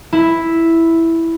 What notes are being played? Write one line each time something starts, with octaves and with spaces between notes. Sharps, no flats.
E4